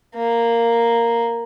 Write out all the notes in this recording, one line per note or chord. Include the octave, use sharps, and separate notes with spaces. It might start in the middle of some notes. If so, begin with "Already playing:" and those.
A#3